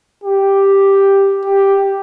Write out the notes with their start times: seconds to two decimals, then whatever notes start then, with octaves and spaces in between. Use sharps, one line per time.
0.24 G4
1.45 G4